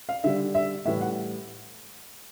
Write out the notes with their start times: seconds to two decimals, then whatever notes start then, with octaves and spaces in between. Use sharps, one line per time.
0.09 F5
0.24 D3 G3 E5
0.55 E5
0.86 A2 E3 G3 E5
1.01 F#5